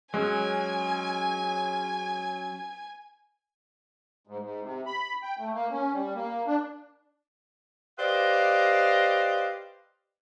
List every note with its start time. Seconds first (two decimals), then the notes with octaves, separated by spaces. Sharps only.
0.14 F#3 G#3 C#4 G#5
4.27 G#2
4.40 G#2
4.63 C3
4.86 B5
5.23 G5
5.39 A3
5.54 A#3
5.71 C#4
5.93 G3
6.15 A#3
6.47 D4
7.98 G4 B4 C5 D5 D#5 F5